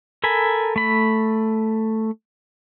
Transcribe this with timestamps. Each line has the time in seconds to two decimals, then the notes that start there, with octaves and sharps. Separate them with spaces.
0.24 A4 A#4 G#5 B5
0.76 A3 B5